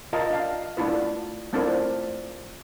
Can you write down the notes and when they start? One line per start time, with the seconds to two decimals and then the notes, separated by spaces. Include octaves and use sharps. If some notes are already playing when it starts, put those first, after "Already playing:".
0.13 F4 A#4 D#5 F5 A5 A#5
0.30 D4 F5
0.77 A3 D4 E4 F4 B4
1.53 A3 C4 D4 E4 F4 A#4